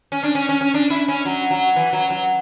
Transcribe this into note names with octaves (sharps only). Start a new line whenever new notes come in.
C#4
D4
C#4
C#4
C#4
D4
E4
C#4
F#3
F#3
E3
F#3
F#3